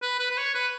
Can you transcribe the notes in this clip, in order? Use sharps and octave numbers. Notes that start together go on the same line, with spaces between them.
B4
B4
B4
C#5
B4